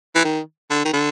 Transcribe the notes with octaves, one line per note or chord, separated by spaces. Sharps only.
E3
D#3
D3
D#3
D3